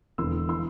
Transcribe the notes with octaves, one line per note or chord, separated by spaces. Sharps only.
E1 E2 D3 C6 E6
E3 C6 E6